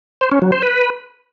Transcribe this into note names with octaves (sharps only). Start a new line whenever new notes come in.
C5
C#4
F#3
C5
B4